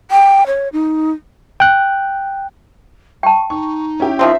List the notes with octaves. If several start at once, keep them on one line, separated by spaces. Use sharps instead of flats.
G5
C#5
D#4
G5 F#6
G5 A5 C#6
D#4 C#6
C#4 E4 G4
D#3 F3 C4 E5